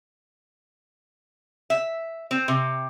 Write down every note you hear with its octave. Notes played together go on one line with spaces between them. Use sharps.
E5
C4
C3